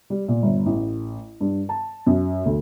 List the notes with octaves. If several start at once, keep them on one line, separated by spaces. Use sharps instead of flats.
G3
A#2
G1
A1
G2
A5
F#2
D2